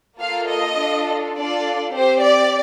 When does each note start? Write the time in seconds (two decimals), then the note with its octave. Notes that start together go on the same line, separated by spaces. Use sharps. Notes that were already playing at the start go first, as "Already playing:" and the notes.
0.19 A#3 F4 A4 F5
0.48 D#5
0.78 D4 F4 A4
1.36 D4 F4 A4 D5
1.94 C4 G4 C5
2.23 D5